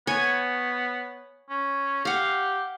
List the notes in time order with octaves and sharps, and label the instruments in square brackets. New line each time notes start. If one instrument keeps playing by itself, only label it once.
[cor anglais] B3 [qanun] C#5 G#5
[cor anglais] C#4
[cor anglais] G4 [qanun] F5 F#5